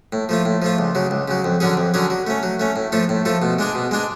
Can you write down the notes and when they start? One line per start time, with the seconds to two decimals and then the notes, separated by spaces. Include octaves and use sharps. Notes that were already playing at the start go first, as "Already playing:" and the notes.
0.13 A2
0.29 F3 A3 F4
0.45 A2
0.62 F3 A3 F4
0.79 C#2
0.95 C#3 F#3
1.11 C#2
1.28 C#3 F#3
1.44 F2
1.60 D3 F#3 C#4 G#4
1.77 F2
1.94 D3 F#3 C#4 G#4
2.10 F#3
2.27 A3 C#4
2.43 F#3
2.60 A3 C#4
2.76 A2
2.92 F3 A3 F4 A4
3.09 A2
3.25 F3 A3 F4 A4
3.42 B2
3.59 G#3 D4 G#4
3.75 B2
3.91 G#3 D4 G#4